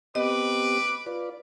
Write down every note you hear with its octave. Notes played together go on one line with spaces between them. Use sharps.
B3 C4 G4 B4 D#5 D6
F4 B4 D5